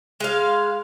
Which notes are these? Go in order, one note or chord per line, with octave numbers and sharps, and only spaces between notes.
G#3 F5